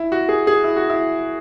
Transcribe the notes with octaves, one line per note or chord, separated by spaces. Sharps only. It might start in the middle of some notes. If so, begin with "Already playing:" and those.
Already playing: E4
F#4
G#4
G#4
E4
F#4
E4